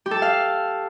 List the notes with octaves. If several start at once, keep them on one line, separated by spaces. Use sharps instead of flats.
G4
A4
A5
F5